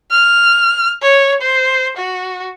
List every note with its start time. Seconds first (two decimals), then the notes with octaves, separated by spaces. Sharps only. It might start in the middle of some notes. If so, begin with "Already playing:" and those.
0.11 F6
1.02 C#5
1.41 C5
1.97 F#4